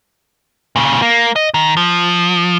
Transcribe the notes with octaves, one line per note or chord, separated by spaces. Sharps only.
A#2 C#3
A#3
D#5
D#3
F3